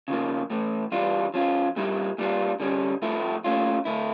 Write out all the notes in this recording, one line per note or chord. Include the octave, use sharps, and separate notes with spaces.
C#3 F3 A#3
A2 E3 A3
E3 G3 D4 F4
F3 C#4 F4
A#2 G3 A#3 E4
A#2 G3 D4 F4
D3 G3 C#4
A2 F3 A3 E4
A#2 A3 C#4 F4
D3 A3 E4